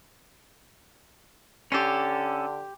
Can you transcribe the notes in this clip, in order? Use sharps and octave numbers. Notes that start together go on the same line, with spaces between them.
D3 C#4 G4 A4 C6